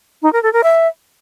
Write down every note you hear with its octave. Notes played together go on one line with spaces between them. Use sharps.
D#4
A#4
A4
A#4
E5